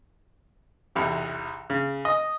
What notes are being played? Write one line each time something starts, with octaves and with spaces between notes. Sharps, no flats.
B1 E2 C3
C#3
D#5